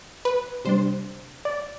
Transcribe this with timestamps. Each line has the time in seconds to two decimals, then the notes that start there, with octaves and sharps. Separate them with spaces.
0.25 B4
0.65 C3 G3 D4 C5
1.45 D5